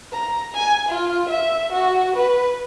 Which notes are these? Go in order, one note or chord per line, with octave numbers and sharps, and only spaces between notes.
A#5
G#5
F4
E5
F#4
B4